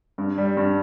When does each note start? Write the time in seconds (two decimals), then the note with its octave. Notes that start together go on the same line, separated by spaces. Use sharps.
0.18 G2
0.38 G3
0.57 G2